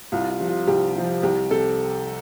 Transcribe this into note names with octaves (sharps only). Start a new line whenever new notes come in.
C2 F4
F4
C3 F3
F4
C2 G4
C3 F3
C2 G4
C3 A4